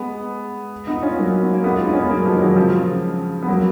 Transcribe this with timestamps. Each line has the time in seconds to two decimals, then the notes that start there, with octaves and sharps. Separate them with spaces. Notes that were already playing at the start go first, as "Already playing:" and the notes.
Already playing: G#3 B3
0.87 B3 D#4
1.03 C#4 F4
1.18 F#3 A#3
1.41 B3
1.53 A#3
1.64 G#3 B3
1.77 F4
1.85 D#4
1.93 C#4
2.01 B3
2.10 F#3 A#3
2.26 F3 G#3
2.41 D#3 F#3
2.56 C#3 F3
3.42 B3
3.48 F#3 A#3